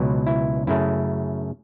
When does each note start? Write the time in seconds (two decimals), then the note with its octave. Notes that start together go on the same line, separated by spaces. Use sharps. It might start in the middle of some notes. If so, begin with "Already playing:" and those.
Already playing: C#2 B2 F#3
0.26 E4
0.67 F#2 C#3 A3 E4